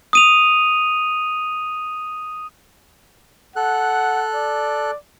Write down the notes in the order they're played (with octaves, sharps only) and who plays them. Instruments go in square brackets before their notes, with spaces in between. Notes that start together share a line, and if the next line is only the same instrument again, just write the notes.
[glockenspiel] D#6 D#7 F7
[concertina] A4 F#6 [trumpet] F#5
[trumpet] D5